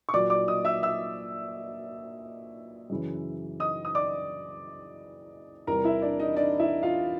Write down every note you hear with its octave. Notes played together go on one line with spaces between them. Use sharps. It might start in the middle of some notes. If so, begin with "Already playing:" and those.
C#6
A#2 F#3 A#3 D5 D6
D5 D6
D#5 D#6
E5 E6
E5 E6
F#2 C#3 E3
D#5 D#6
D#6
D5 D6
E2 C3 E3 G3 A#4 A#5
E4 E5
D4 D5
D#4 D#5
D4 D5
E4 E5
F4 F5